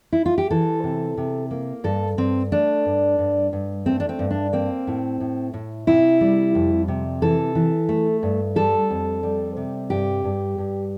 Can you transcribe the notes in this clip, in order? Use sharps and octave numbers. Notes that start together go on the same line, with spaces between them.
E4
F4
G4
E3 A4
C3
C3
A#3
G2 A4
G2 C4
A3 D4
G2
G2
G2
A3 C4
D4
C4
G2
D4
A#3 C4
A2
A2
A2
C3 E4
G3
F2
C3
E3 A4
E3
A3
G2
G3 A4
F2
G3
C3
G2 G4
G2
G2